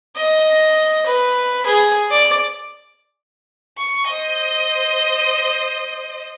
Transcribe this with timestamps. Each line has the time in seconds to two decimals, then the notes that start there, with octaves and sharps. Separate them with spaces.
0.17 D#5
1.06 B4
1.66 G#4
2.11 D5
3.77 C#6
4.07 C5 D#5